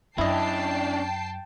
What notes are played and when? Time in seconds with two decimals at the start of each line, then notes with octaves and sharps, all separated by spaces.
0.18 F#2 C#4 D4 E4 D#5 G5 A5 C7